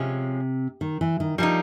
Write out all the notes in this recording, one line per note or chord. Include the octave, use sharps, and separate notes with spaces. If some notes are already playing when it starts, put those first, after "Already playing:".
Already playing: C3 F3 G#3 C#4
D#3
E3
D#3
F3 G3 A#3 D#4